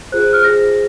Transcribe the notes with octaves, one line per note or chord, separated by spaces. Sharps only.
F4 G#4 C5 F#6
F6
F4 G#4 C5 A#6